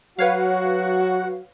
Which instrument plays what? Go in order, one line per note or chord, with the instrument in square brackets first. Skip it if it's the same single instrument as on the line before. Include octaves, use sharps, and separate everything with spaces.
[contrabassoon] F#3 [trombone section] F#4 [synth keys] B4 C#5 F5 [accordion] F#5